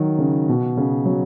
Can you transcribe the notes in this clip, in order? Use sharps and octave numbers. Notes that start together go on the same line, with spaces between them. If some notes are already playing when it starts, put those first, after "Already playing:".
Already playing: D#3 F#3
C#3
B2
C#3
F#3